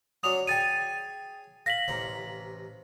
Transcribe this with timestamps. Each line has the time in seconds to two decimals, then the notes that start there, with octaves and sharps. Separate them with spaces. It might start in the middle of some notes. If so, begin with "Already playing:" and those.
0.23 F#3 C#4 D4 D#6 F7
0.47 G#4 G5 G#5 A6 D#7
1.66 F5 A#6 B6 F#7
1.88 A1 C3 A#5